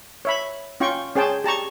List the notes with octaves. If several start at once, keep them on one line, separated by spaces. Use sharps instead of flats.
C#5 E5 B5
C#4 F4 G5 C#6
C#4 G#4 C5 G5 A5
G4 A5 A#5 C#6